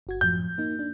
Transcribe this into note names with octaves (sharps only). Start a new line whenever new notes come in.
G1 F#4 G#6
F#2 A2 F3 G6
A#3 D#4
D4